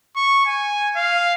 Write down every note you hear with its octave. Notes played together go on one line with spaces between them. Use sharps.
C#6
G#5
F5